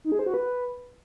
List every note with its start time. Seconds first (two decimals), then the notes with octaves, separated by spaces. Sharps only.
0.04 D#4
0.12 G#4
0.19 C5
0.26 F#4
0.34 B4